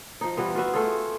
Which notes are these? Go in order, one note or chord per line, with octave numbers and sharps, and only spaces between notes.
F3 D#4
E3 G3 B3 F4
F4 F#4 B4 E5
A3 F4 G#4